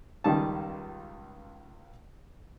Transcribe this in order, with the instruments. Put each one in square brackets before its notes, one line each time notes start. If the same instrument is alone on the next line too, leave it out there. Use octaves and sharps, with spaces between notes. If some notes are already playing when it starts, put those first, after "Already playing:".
[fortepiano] C#2 D#3 G3 D#4 A5